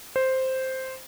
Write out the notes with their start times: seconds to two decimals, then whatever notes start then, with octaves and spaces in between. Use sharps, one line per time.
0.16 C5